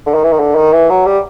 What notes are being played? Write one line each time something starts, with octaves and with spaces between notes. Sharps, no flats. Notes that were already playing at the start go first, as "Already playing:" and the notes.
D3
D#3
E3
D#3
D3
D#3
E3
F#3
G3